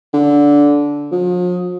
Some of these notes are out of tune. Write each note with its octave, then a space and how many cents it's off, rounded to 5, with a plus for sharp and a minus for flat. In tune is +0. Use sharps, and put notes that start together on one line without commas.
D3 -15
F3 +40